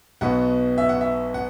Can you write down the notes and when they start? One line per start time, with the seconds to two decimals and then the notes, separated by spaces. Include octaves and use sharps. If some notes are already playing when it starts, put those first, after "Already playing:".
0.21 B1 B2 B3 F#5
0.78 E5
0.89 F#5
1.01 E5
1.34 F#5